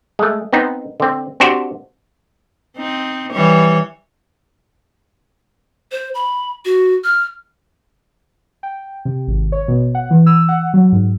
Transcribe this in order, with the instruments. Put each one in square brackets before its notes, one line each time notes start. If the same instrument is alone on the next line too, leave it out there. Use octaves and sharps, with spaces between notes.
[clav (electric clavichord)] G#3 A3
B3 C4 D#4
D3 C4
C4 D4 F#4 G4 C5
[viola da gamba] C4 D#4
E3 G3 C#5
[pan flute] C5
B5
F#4
F6
[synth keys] G5
C3
G#1
C#5
B2
F#5
E3
E6
F#5
F#3
G#2